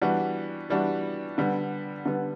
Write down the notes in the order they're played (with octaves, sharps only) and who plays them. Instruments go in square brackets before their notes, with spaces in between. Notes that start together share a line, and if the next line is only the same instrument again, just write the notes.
[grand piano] E3 G3 B3 D4 F#4
E3 G3 B3 D4 F#4
D3 G3 B3
D3 G3 B3